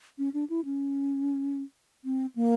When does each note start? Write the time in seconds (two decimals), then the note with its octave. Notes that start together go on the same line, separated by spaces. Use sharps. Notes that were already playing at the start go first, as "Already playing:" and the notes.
0.18 C#4
0.34 D4
0.50 E4
0.65 C#4
2.04 C4
2.35 A#3